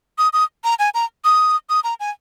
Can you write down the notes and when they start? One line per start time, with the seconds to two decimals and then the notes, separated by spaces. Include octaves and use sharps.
0.18 D#6
0.33 D#6
0.64 A#5
0.79 G#5
0.94 A#5
1.25 D#6
1.70 D#6
1.84 A#5
2.00 G#5